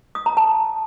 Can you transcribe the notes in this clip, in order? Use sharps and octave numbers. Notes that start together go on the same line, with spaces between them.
D#6
A#5
A5